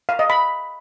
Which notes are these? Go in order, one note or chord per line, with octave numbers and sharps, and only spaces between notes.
F5
D#5
B5